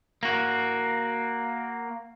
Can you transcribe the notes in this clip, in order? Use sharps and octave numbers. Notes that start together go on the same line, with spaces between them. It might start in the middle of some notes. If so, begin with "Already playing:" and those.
A#3 F#4